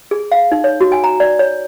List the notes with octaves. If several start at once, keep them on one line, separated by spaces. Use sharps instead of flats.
G#4
F5
D#4
C#5
F#4
G#5
A#5
D5
C#5